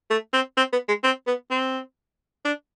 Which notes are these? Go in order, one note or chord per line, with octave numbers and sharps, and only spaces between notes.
A3
C4
C4
B3
G#3
C4
B3
C4
D4